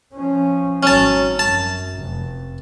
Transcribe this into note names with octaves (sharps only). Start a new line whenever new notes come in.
F3 C#4
G#1 F#3 C#4 A5
F#2 A5
F1